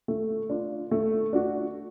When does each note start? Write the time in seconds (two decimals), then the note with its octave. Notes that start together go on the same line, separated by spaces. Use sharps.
0.08 A3
0.50 D4 F4
0.91 A3
1.33 D4 F#4